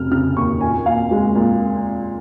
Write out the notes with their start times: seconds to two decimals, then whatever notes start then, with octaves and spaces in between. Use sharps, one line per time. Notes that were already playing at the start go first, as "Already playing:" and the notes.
Already playing: F1 C#3 F6
0.11 C#3 F6
0.37 D#2 C#6
0.61 A#2 G#5
0.86 A#2 F5
1.11 G#3
1.35 A#2